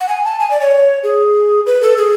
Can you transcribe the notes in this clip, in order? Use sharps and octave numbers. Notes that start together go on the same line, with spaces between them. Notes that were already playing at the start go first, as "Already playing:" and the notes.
F#5
G#5
A5
G#5
D5
C#5
G#4
B4
A4
G#4